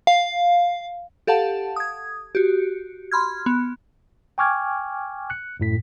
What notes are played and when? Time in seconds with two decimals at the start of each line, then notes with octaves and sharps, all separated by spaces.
0.07 F5
1.27 G4 A4 F5 F#5 A5
1.76 D#6 G#6
2.35 F#4 G4
3.11 B5 C6 F6 G#6
3.46 B3
4.38 G5 G#5 C#6 D6 F6 G#6
5.30 F#6 C#7
5.60 F#2 A2 B6